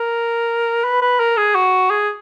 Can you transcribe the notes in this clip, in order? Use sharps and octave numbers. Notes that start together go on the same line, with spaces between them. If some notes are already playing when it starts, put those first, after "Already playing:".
Already playing: A#4
B4
B4
A#4
G#4
F#4
G#4